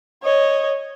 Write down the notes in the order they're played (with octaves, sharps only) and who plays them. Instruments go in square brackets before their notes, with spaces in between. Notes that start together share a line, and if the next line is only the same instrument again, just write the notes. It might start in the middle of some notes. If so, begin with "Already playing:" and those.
[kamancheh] C#5 D#5